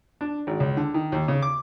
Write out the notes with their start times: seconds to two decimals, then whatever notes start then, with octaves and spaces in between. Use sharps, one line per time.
0.21 D4
0.47 G#1
0.60 C#2
0.77 D3
0.94 D#3
1.12 D#2
1.28 C#3
1.42 D6